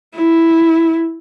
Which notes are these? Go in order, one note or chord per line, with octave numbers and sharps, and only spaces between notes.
E4